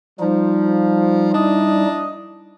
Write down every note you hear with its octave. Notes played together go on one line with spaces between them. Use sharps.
F3 G3 D#4
D4 E4 D#5